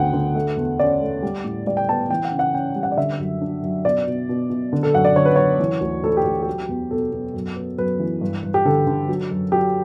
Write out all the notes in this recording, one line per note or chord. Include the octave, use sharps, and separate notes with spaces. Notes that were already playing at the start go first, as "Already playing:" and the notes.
Already playing: D2 D3 B3 F#5 G5
D3
A3
E2
C#4 D5
A3
G3
A2
G3 D5
G5
B3 A5
E3 G5
F#5
C#3
F#5
C#4 G5
G3
F#5
D5
D3 E5
F#2
D4
F#2
B2 D5
B2
B2
B2
D3
A4
F#2 F#5
D5
D3 C#5
B4
F#2 C#5
E3
D2
D2 A4
G4
D2
F#3 G4
E2
B2 A4
B2
F#2
B3
F#2 B4
E3
G2
G2
G4
D3 A4
D3
F#3
F#2
F#3 G4